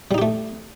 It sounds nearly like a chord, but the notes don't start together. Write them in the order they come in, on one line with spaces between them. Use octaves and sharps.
G3 D#4 G4 A3